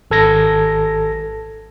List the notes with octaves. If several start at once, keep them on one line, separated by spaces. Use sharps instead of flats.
G#1 A4 G#6 A#6